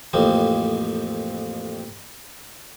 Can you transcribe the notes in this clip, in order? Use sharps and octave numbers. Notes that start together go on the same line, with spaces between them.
A1 F2 A#3 C4